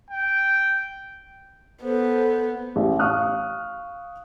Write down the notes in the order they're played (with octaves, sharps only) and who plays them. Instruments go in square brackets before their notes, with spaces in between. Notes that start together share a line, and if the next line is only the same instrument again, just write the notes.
[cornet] G5
[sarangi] B3 [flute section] A4 B4 C5
[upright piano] A1
F5 C#6 D#6 F6 F#6